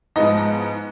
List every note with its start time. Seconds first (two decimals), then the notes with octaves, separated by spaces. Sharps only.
0.16 G#2 F3 G#3 B3 D#4 D#5